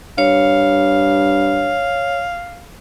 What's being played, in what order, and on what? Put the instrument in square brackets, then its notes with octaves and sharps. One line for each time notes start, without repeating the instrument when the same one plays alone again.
[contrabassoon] G2 [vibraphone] C#5 [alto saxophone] F5